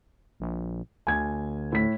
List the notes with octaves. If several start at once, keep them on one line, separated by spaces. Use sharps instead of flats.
A#1
D2 G#5 G#6
A2 B6